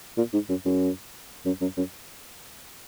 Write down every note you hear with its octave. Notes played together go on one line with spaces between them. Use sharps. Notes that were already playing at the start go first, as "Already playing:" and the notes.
A#2
G#2
F#2
F#2
F#2
F#2
F#2